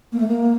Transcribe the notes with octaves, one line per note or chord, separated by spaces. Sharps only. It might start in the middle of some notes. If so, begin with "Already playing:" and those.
A#3
A3
A#3